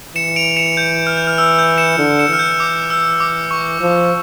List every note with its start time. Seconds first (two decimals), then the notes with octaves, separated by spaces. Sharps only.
0.15 E3 C#7 E7
0.36 D7 F7
0.56 C#7 E7
0.77 G6
1.07 F6
1.17 G6
1.27 F6
1.38 E6
1.59 G6
1.78 C#7 E7
1.99 D3
2.19 C#7 E7
2.29 E3 F6
2.39 G6
2.60 D6
2.90 E6
3.20 D6
3.51 C#6
3.81 F3